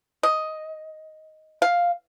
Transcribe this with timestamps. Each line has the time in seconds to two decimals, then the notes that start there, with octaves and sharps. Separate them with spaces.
0.23 D#5
1.62 F5